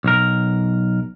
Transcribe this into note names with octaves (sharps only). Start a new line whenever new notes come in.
B1 A#4